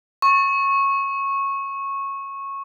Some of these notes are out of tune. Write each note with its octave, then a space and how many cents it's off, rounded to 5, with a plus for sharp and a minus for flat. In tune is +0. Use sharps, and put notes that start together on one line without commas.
C#6 -15